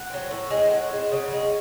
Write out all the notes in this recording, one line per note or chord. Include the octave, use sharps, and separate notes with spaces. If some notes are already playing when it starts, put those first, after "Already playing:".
Already playing: F#5
F#3 C4
A2
G#3 C4
A2 F#5
G#3 C4
C#3
G#3 C#4